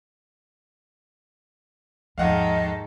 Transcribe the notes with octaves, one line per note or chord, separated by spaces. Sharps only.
D#2 G#2 D#3 F3 A4 D#5 F5 F#5